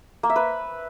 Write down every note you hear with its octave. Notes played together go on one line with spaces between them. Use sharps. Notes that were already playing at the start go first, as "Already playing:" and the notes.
A#3
E5
B4